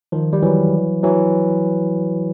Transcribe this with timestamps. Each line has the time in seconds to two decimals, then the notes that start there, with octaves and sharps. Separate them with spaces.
0.12 D#3 F3
0.33 G3
0.42 E3 F#3
1.03 E3 F#3